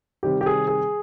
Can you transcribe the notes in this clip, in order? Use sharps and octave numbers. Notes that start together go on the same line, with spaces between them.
C3 D#3 G3 C4 G4
G4
G#4
G#4